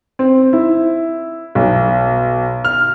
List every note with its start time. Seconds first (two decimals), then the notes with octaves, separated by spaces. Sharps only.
0.19 C4
0.53 E4
1.55 B1
2.65 F6